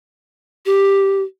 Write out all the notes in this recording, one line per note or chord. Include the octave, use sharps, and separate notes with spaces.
G4